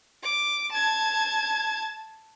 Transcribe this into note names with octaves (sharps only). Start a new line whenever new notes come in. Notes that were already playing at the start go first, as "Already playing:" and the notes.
D6
A5 G#6